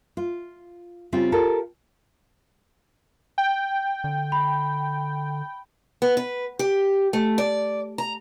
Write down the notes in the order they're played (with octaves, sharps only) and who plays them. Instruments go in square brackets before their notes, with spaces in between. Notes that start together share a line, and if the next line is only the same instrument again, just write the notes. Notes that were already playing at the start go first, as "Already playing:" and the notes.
[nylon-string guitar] F4
C#3 G3 C4 C#4 F4
F4 G4 A4 A#4
[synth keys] G5
[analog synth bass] D3
[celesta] B5
[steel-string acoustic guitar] B3
B4
G4
A3
D5
A#5